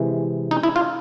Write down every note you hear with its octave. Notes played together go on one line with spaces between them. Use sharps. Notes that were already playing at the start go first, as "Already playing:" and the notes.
Already playing: C3 E3 G#3
D#4
E4
F4